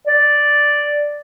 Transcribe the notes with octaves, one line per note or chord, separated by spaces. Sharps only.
D5